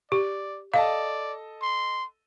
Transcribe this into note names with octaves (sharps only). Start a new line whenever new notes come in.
G4 D5
A4 D5 D#5 F5 A5
C6